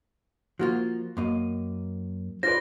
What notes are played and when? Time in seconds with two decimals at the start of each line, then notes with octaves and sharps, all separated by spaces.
0.59 F3 A#3 F4 F#4
1.17 F#2 A#3 D#5
2.43 F4 B4 C5 D5 A#6